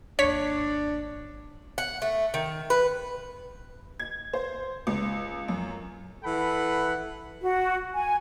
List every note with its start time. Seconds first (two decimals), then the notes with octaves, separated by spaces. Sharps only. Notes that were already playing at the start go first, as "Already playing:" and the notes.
0.19 G#1 D#2 D4 C#5 B6
1.78 F#5
2.02 A3
2.34 D#3
2.70 B4
3.99 G#6
4.33 C5
4.87 C#2
5.48 F#2
6.24 E3 A4 F#5 B5
7.41 F#4
7.94 G#5